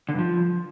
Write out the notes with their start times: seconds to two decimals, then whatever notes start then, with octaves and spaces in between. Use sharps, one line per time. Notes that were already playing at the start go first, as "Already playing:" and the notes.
0.09 D3
0.14 G2
0.19 F3